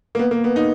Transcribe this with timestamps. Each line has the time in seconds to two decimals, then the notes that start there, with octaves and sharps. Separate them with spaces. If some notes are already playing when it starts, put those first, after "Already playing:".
0.15 A#3
0.19 B3
0.31 A#3
0.44 B3
0.56 D#4